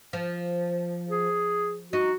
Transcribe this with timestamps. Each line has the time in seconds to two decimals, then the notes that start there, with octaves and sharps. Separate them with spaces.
0.13 F3
1.09 G#4
1.93 D#4 F#4